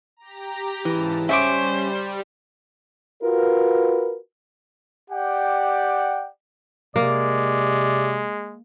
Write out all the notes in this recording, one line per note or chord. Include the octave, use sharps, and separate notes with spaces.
G4 A#5
G#2 C#3 E3 A5
G3 C#4 C5 E5 C#6 D6
F4 F#4 A#4 B4
G4 D5 F#5 G5
C3 G#3 A#3 D5